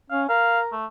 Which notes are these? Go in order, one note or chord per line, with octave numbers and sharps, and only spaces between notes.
C#4 F5
A#4 F5
A3